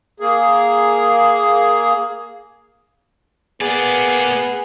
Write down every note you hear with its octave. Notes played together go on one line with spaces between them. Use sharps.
A#3 G#4
A#3 B3 G#4 D5